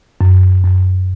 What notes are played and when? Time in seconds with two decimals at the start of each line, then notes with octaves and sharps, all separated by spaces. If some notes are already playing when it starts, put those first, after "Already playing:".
0.21 F#2
0.64 F#2